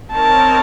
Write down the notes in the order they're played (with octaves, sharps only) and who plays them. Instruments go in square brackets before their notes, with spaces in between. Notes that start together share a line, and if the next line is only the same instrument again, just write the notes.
[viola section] C4 D#4 A#4 C#5 [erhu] A5